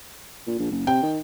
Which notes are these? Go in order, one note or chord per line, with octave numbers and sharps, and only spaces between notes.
A#2
A#1
F#1
C3 G5
D#3